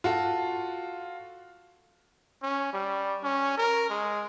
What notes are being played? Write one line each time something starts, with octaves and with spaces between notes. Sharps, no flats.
F4 F#4 A4
C#4
G3
C#4
A#4
G#3